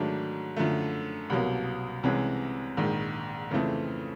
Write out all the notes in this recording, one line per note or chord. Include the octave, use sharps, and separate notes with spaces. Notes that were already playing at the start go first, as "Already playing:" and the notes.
Already playing: G#2 D#3 F#3 A3 D4
F#2 D3 F3 A3
C2 B2 F#3 A#3
C2 C3 E3 G#3 C#4
A#1 G#2 D#3
F2 C#3 E3 A3 C4